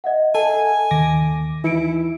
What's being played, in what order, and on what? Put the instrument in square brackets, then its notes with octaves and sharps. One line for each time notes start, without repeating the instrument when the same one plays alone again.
[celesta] D#5 E5 F#5
[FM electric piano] A4 [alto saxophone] G#5
[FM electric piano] D#2 D6 A#6
[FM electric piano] E3 [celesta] D#4 C#7 D7 [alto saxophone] E4